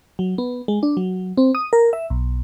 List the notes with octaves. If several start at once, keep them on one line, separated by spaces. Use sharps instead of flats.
F#3
B3
G#3
D4
F#3
C4
D#6
A#4
E5
B1